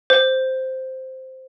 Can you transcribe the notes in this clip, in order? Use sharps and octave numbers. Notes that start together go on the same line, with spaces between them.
C5